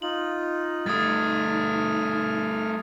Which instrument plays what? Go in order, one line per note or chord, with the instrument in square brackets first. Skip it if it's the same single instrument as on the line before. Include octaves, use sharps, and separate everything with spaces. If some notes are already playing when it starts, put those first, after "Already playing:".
[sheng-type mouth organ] D#4 F4 [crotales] F#7
[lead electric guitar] G3 A3 [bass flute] D#4 [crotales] D#6 G#6 A6 [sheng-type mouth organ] F6